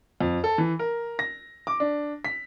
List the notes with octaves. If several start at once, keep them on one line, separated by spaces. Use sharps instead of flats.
F2
A4
E3
A#4
A#6
D6
D4
B6